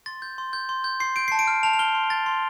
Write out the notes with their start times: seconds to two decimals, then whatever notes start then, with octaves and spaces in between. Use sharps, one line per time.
0.06 C6 A6
0.22 G6
0.38 C6
0.53 G6
0.69 C6
0.84 G6
1.00 C6 C7
1.16 G6 D7
1.28 A5 C7
1.39 D7
1.48 F6
1.63 A5 F7
1.73 F7
1.79 F6 G7
1.95 C6
2.10 G6 A6
2.26 C6